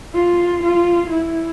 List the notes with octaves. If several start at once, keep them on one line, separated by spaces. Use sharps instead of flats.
F4
F4
E4